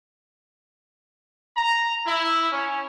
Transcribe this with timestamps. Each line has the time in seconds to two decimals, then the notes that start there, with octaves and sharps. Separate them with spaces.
1.57 A#5
2.06 E4
2.52 C#4